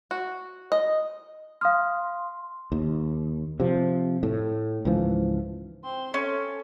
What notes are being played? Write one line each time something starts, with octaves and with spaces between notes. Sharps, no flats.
F#4
D#5
F5 C6 D#6 F6
D#2
C3 F3
A2
C#2 G#2 E3 F3
C4 C6
C#4 A4